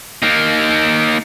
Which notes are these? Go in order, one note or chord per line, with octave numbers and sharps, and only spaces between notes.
A#3 D#4